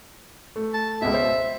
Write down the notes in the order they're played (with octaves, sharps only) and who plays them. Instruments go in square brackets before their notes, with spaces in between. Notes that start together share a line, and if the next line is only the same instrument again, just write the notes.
[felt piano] A3
[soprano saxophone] A5
[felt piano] C#2 B2 [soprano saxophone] E5
[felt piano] C5